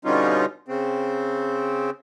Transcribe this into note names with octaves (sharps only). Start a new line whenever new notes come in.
B2 D3 G3 C#4 D#4 F4
C#3 C4